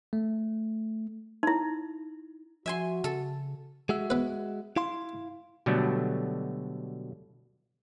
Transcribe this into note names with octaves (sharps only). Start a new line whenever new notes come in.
A3
D#4 E4
F3 F#4 E5 G#5 C6
C#3 A4
G#3 F#4 E5
B3 B4
E4 F5 C6
B2 D3 F#3 G3 A3